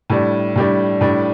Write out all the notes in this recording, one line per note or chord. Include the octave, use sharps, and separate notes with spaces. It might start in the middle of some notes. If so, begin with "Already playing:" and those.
A2 G3 D4
A2 G3 D4
A2 G3 D4